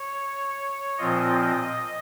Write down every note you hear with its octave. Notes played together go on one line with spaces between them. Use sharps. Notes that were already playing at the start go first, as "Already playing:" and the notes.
Already playing: C#5
A#2 F3 C4 F4 D#5